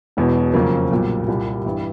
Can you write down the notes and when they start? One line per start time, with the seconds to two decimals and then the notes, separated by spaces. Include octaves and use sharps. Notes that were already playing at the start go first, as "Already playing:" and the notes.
0.17 E1 E2 B2
0.54 F2 C#3 F#3 A#3
0.91 B1 A#2 G3
1.28 C2 A#2 G3
1.65 G2 E3 G3